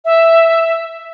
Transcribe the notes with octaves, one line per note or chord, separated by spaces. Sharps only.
E5